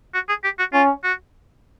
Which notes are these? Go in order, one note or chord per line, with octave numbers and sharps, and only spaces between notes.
F#4
G#4
G4
F#4
C#4 F4
F#4